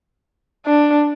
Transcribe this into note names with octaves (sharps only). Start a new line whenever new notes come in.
D4